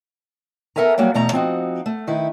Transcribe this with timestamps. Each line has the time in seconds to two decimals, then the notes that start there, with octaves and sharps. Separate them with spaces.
0.76 B3 A4 A#4 E5 G#5 A#5
0.98 F#3 G3 A#3 F#4 G#4
1.14 E2 B2 A3 A5 A#5
1.32 F3 C4 D#4 F#4
1.86 A3
2.07 D#3 D#4 E4 B4